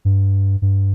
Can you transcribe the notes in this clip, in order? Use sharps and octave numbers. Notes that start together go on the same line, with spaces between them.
G2
G2